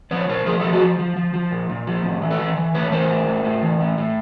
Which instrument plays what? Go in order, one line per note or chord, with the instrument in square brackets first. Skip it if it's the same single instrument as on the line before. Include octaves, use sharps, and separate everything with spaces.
[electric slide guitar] F3 B4 C#5
A#2 A#4 C5
F3 G#4 A#4
G4 A4
F3
F#4 G#4
F3
F3
F3
F3
A#2
A#2
F3
A2
E3
A4 B4
E3
E3
A2 B4 C#5
E3 A#4 C5
A2
A2
A2
E3
A2
A2